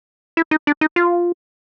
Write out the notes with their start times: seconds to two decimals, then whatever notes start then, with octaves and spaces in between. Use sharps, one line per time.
0.37 E4
0.51 D#4
0.67 D4
0.81 D#4
0.96 F4